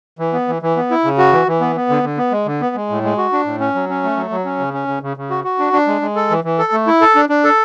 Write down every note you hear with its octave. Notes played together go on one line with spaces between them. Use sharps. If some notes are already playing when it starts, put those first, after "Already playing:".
E3
B3
E3
E3
B3
E4
C#3
F#4
E3
E3
B3
B3
D3
D3
B3
G#3
D3
B3
G#3
A2
G#3
F#4
D4
A2
C#4
F#3
C#4
A3
F#3
F#3
C#4
C#3
C#4
C#3
C#3
C#3
F#4
F#4
D4
D4
G#3
G#3
A4
E3
E3
A4
A3
E4
A4
D4
D4
A4